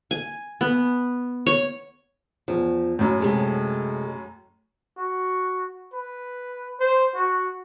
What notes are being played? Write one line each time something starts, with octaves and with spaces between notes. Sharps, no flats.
G#5
B3
C#5
E2 F3
F#2 A2
C3 G#3 A4
F#4
B4
C5
F#4